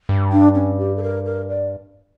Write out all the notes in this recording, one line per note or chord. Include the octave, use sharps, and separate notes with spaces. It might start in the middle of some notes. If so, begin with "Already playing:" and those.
G2
D4
C#4
G4
A4
A#4
A#4
D5